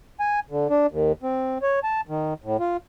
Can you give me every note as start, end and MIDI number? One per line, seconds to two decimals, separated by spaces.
0.20 0.40 80
0.51 0.67 50
0.70 0.86 62
0.91 1.12 39
1.23 1.58 60
1.62 1.79 73
1.84 2.01 81
2.09 2.34 51
2.44 2.57 45
2.60 2.77 65